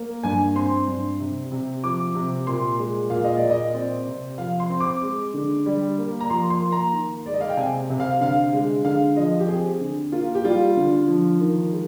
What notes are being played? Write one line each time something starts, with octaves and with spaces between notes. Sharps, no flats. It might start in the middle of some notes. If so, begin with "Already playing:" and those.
Already playing: A#3
G2 G#5
C4 C6
G2
C3
C3
F3 D6
C3
A#2 C6
G#3
A#2 F5
D#5
D5
A#2
D#5
C4 D5
C3
F3 F5
C6
C4
D6
G#3
D3
G3
A#3
A#5
F3 C6
C6
A#3
A#5
D#3
G#3 D5
D#5
F5
G5
C3 G#5
C3
F5
D3 F5
G#3
D3 F5
F3 D#5
G4
C4 G#4
D3
A#3 F4
G4
G3 F4
D3
F3
D#3
G#3